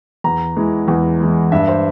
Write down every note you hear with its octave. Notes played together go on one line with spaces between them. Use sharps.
E2 A#5
E3 G#3
E2
E3 G#3
G2 E5
C5